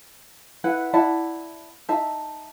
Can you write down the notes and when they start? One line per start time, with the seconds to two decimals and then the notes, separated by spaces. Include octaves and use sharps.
0.64 E4 B4 F#5
0.94 E4 D5 F#5 A5
1.89 D#4 E5 A5